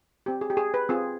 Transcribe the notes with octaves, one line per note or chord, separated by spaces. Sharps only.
C4 G4
G#4
G4
G#4
B4
C4 F4 G#4